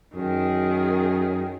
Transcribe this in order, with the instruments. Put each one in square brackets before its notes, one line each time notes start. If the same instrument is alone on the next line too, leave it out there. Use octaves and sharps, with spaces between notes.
[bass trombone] F#2 [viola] D#3 G#4